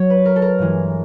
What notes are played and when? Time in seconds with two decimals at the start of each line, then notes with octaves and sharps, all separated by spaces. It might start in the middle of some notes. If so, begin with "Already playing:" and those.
Already playing: F#3 C#5
0.10 B4
0.25 A#4
0.36 A4
0.42 A#4
0.59 G2 E3 G#3